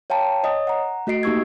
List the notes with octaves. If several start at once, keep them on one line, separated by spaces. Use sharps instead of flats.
C#5 F5 G5 A5 A#5
C#5 D#5 D#6
F#5 A#5
A3 F#4 D#5 C7 D7
A#3 D#4 G4 C#6 E6 G#6